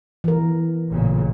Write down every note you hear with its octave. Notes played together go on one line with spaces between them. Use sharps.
E3 A#4
A1 A#2 C#3